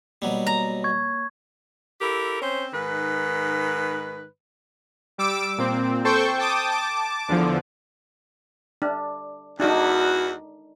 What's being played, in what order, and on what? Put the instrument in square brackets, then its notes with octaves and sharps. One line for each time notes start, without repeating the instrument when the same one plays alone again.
[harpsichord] B2 F#3 G3 [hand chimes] A#3 C#5
[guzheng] A#5
[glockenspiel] C#6 G#6
[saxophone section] E4 G4 A4 A#4
C4 C#4 C5
G#2 D#3 B4
[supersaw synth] G3 D6 E6 D7
A#2 C4
A4 C5 G5 C#6 G6
G5 A5 D6 D#6
A5 D6
E2 D3 F3
[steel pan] D4
[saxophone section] E2 F#4 [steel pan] D4 D#4